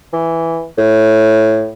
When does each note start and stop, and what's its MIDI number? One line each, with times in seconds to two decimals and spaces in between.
0.13 0.65 52
0.78 1.71 45